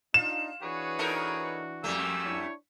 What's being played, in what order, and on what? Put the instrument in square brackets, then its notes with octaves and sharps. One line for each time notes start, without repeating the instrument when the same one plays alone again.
[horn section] D4 D#4 [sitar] F4 [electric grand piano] E7
[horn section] E3 D4 F#4 [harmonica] G#4 B4 C#5
[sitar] D#4 A4 A#4
[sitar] F2 G3 A3 [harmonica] A#3 G#5 E6
[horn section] D4 E4 C#5